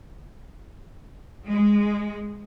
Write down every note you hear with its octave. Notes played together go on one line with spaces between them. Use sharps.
G#3